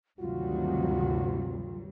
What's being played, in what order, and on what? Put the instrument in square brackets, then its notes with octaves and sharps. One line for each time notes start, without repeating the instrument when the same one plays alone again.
[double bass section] D2 C3 D#3 [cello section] G2 F#3 G3 [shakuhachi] F4 [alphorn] F#4